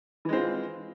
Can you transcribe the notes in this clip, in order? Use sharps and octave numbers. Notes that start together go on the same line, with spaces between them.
E3 G#3 C4 F4